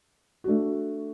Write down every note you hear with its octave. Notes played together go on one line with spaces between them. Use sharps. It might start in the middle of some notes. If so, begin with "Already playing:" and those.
A3 D4 F#4